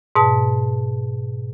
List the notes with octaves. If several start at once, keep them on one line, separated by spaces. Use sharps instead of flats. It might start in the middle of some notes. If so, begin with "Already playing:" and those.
G#2 B2 A5